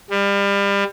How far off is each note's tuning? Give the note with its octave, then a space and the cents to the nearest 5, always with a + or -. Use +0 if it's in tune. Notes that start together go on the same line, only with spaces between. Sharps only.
G3 +30